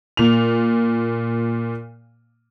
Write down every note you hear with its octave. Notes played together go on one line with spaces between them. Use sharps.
A#2 F7